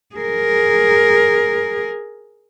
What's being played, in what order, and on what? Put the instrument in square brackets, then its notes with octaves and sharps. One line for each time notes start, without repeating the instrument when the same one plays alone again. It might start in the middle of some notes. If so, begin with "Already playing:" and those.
[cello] G#4 A#4